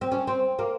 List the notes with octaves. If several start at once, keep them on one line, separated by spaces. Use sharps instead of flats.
C4
C#4
C4
A#3